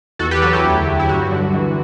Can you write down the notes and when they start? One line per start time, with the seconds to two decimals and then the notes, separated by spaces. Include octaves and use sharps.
0.19 E2 F#4 A4
0.31 G4 B4
0.42 F#3 F#4 A4
0.52 E4 G4
0.64 D2
0.86 F#3
0.99 E4
1.09 G2 F#4
1.31 D3
1.54 E3